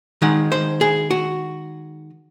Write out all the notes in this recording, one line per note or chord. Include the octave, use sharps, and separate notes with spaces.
D#3 G#3 D#4 F#5
C5
G#4
F#4